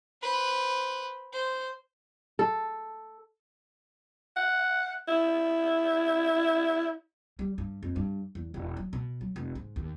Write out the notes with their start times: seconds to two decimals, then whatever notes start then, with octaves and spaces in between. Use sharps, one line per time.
0.22 B4 C5
1.34 C5
2.39 A4
4.36 F#5
5.08 E4
7.39 G3
7.58 G2
7.83 F2
7.96 G2
8.35 E2
8.54 E1
8.77 F#3
8.93 B2
9.21 F#3
9.36 F1
9.55 G#2
9.76 D#2